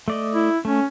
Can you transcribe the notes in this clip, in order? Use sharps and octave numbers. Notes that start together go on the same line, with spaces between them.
A3 D5 D#5
E4
A3 C#4